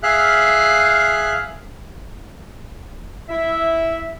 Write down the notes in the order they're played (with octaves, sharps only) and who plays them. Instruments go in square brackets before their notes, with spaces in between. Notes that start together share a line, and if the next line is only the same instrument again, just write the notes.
[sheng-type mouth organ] G#4 E5 F5 F6 F#6
[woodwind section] E4 E5